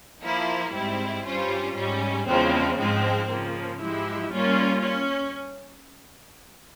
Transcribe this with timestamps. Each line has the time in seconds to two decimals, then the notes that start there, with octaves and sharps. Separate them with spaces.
0.22 F3 A#3 E4
0.73 G#2 G3 C4 E4
1.25 G2 G3 C#4 F4 C5
1.76 G#2 G3 C#4
2.28 E2 C#3 F3 G#3 C4
2.79 G#2 F3 G#3 C4
3.30 C#3 F3 A#3
3.82 G#2 F3 G#3 E4 G4
4.33 G3 A#3 C#4 F4
4.84 C#4